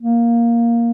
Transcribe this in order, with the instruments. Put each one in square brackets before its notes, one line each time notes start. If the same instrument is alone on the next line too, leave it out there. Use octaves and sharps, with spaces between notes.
[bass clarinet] A#3